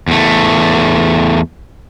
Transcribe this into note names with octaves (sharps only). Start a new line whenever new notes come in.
E2 A3